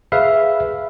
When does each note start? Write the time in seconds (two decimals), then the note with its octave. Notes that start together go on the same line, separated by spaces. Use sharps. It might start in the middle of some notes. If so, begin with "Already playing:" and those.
0.12 G#4 B4 E5 F5